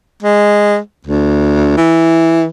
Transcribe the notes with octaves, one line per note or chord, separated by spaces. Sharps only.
G#3
D2
E3